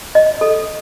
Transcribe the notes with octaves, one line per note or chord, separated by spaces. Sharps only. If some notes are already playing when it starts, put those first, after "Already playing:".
D#5
A4